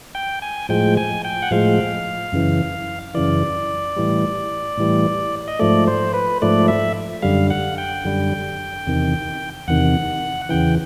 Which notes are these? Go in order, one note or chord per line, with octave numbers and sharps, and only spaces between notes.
G5
G#5
A2 F3 G#3 G5
G#5
G5
F#5
A2 F3 G#3 F5
F#2 C#3 E3
F#2 C#3 E3 D5
A2 E3 G3
A2 E3 G3
D#5
G#2 F3 A3 D5
C5
B4
G#2 F3 A3 D5
E5
F#2 D3 G3 F5
F#5
G5
F#2 D3 G3
E2 C3 D#3
E2 C3 D#3 F#5
E2 C#3 E3 G5